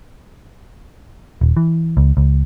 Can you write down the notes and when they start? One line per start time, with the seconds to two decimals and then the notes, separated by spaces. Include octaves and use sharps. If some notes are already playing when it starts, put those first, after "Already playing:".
1.41 D#1
1.57 E3
1.97 C#2
2.17 C#2